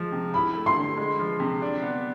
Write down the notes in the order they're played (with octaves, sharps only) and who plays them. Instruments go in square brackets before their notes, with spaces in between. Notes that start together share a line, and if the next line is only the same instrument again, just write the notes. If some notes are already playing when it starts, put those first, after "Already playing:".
Already playing: [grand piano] F3 G#3
C3
[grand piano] E4 [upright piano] B5
[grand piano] A3
[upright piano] C6
[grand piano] D3
G#3
F3
C3
D4
B3